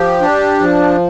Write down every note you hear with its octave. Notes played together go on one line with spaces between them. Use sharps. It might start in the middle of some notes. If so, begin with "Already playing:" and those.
Already playing: F3 G4
D4
F3